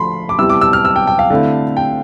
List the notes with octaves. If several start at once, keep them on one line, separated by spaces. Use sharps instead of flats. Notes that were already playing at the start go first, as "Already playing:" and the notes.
Already playing: D3 F3 A3 B5 C6
D6
C3 G3 B3 E4 E6
D6
E6
F6
E6
G5
G5
F5
D3 A3 C4 E4
G5